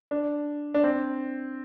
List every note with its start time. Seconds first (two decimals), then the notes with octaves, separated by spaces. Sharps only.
0.11 D4
0.74 D4
0.84 C4